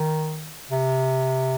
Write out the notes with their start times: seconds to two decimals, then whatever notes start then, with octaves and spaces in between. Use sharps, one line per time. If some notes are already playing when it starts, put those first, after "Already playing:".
Already playing: D#3
0.70 C3